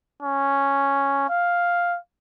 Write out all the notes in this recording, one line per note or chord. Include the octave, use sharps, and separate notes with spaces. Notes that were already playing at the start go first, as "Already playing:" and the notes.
C#4
F5